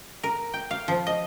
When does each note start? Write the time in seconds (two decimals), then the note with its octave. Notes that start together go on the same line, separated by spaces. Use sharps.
0.23 A#4
0.54 G5
0.71 F5
0.88 F3
1.07 D#5